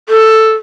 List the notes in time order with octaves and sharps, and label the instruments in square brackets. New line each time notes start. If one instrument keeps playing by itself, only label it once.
[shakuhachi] A4